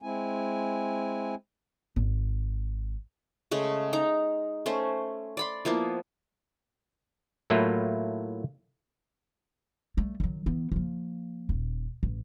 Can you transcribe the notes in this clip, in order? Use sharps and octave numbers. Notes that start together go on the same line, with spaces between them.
G#3 C4 E4 G#5
G#1
C#3 G#3 A3
D#4 A#5
A3 C#4 C5
D5 B5 C6
F3 A#3 B3 E4
A2 F#3 A3 A#3 E4 F4
G3 A3
D#3 F#3
E3 B3
F3 A#3
D#1
A1